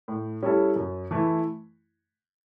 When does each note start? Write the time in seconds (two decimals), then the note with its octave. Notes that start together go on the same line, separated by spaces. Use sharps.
0.08 A2
0.43 G3 C#4 E4 A4
0.76 F#2
1.11 E3 A3 E4